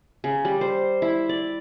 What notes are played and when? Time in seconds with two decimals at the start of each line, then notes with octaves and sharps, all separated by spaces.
0.24 C#3
0.45 G3
0.61 C5
1.02 E4
1.29 D5